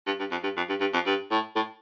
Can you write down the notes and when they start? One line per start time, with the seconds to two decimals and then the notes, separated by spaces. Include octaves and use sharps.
0.06 G2
0.19 G2
0.31 F2
0.43 G2
0.57 F2
0.69 G2
0.80 G2
0.93 F2
1.06 G2
1.31 A2
1.56 A2